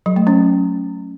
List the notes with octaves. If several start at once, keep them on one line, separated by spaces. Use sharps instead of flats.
F#3
A3
C#4